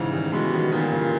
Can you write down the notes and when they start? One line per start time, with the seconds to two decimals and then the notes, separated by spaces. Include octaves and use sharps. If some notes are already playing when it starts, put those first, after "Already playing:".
Already playing: G#2 C#3 E3
0.12 D#3 G3
0.32 B2 E3 G#3
0.52 D#3 G3
0.72 A#2 D#3 G3
0.92 C#3 E3